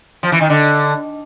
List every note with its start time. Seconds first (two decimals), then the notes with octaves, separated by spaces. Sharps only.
0.23 F3
0.32 E3
0.41 D#3
0.50 D3